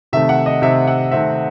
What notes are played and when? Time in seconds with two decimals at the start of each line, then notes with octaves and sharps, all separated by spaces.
0.13 C3 D#3 A3 C4 E5
0.29 F#5
0.46 D#5
0.62 C3 D#3 A3 C4 E5
0.87 F#5
1.11 C3 D#3 A3 C4 E5